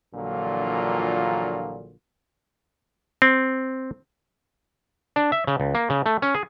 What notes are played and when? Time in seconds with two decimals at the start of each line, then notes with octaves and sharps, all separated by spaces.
0.14 A#1 A#2 D3 E3 F#3 F4
3.22 C4
5.16 D4
5.32 E5
5.47 C#3
5.60 C#2
5.75 A#3
5.90 C#3
6.06 A3
6.22 C#4
6.35 G#4